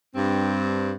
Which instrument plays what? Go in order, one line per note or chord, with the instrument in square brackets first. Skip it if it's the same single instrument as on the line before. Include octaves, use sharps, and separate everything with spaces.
[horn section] G2 C4